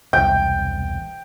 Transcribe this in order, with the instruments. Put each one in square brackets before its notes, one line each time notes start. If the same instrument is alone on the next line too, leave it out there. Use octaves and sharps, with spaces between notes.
[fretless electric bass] E1 C2 [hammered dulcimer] G5